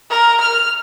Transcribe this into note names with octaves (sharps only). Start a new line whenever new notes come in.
A#4
F6